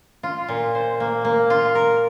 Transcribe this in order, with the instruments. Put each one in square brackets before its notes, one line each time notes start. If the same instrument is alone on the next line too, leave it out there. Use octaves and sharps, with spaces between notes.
[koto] F4
A#2
C5
A#3
A#3
F4
A#4